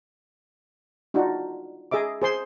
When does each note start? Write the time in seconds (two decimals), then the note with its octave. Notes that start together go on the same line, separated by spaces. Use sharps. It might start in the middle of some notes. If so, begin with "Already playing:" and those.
1.14 D4 D#4 F4 F#4
1.91 G#4 D#5 E5 D6
2.22 G#4 C5 C6